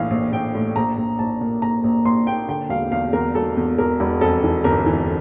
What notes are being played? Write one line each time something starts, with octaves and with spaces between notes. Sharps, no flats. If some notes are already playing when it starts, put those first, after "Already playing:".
Already playing: A#1 A2 E3 F5
A#1
A#1 G5
A2
A#1 A#5
A#1
A#1 A5
A#2
A#2 A#5
A#1
A#1 C6
A#2 G5
D3 G5
E1 F5
E2 F5
E2 A#4
E1 A4
E2
E2 A#4
E1
F2 A4
E3
G1 A#4
E3